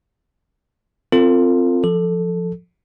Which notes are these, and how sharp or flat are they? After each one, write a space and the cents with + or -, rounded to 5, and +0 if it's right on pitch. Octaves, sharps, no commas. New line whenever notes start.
C4 +0 F4 +0 A4 +35
F3 +0 A4 +0